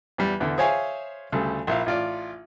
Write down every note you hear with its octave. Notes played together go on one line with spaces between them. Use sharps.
E2 G3
E2 D3
G#4 C5 C#5 E5 F5 G#5
D2 C#3 G3 A4
A#1 E4 F5
A1 F4 D5